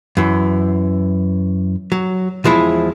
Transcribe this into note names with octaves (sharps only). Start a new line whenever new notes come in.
F#2 E3
F#3
E2 F3 G#3 E4